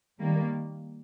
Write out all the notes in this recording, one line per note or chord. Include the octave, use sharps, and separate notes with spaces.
D#3 G3 A#3